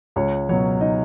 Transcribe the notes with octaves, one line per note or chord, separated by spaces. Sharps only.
C#2 C#5
B2 F#3 C#5
D#4 D#5